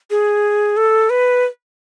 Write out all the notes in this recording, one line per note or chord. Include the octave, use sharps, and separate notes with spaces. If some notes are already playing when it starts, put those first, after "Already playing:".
G#4
A4
B4